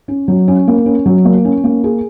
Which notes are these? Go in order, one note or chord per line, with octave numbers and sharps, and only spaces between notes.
C#4
F#3
C#4
A#3
C#4
F#3
A#3
C#4
A#3
G#4